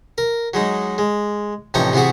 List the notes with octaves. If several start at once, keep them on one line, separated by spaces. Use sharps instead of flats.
A#4
F#3 G#3 D#4
G#3
A1 C3 F3 D#4 C#5 A#5
C3 E3 B3 F#4 G#4